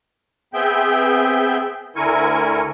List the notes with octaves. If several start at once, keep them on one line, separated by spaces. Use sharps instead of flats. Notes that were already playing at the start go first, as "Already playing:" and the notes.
B3 C4 G#4 E5 G5 G6
D2 D3 E4 A#4 G#5 C#6